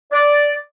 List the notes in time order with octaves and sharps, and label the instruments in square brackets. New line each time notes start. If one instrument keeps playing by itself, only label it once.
[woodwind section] D5